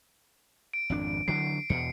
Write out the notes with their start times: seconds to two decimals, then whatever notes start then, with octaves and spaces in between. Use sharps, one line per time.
0.74 D7
0.90 G#1 F2 D4
1.28 D3 E3 F#3 C7 D7
1.70 E2 B2 C#7